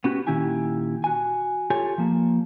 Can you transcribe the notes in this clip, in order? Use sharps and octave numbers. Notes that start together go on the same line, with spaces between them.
B3 C#4 F#4 G4
A#2 D#3 C#4 E4 G4 G#5
F#4 G#5
F4 G4 A4 C#5 G#5
F3 A#3